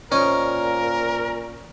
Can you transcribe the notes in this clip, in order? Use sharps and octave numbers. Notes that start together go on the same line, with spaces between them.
A#2 C#4 A#4 C5 D#5